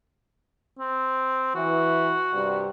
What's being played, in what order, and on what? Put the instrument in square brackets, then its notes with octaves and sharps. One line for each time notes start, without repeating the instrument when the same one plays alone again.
[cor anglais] C4
[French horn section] E3 [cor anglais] F#4
[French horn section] G2 C3 G3